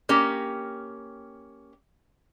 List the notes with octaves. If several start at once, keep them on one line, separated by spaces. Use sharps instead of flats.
A#3 C#4 G4